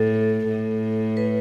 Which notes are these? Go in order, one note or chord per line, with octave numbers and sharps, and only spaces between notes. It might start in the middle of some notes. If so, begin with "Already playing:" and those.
Already playing: A2 A4
A2
B4